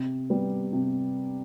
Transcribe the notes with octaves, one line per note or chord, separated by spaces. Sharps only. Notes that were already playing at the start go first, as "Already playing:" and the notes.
Already playing: C3
G3 B3
C3